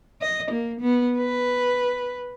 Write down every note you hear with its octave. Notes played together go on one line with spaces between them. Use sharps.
D#5
A#3
B3
B4